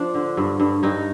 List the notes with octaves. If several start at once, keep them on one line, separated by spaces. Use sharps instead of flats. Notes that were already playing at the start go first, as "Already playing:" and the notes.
Already playing: F3 A#3 D4
D3
G2
G2
G2 D#4